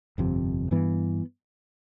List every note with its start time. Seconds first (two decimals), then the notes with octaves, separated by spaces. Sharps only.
0.18 G1 F2 C3
0.71 G2 E3 B3